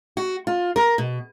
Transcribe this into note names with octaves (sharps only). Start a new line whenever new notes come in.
F#4
F4
A#4
B2